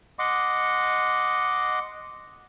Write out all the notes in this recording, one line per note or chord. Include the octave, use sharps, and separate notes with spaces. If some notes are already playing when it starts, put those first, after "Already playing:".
D#5 F#5 C6 D6